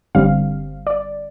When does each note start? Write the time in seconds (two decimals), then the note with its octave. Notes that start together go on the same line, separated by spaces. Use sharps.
0.15 G1 G2 D3 G3 C4 F5
0.87 D5